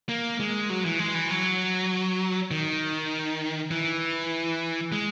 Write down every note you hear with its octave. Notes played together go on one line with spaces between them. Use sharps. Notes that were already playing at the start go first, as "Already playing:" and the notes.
A#3
G#3
F#3
E3
G#3
E3
F#3
D#3
E3
G#3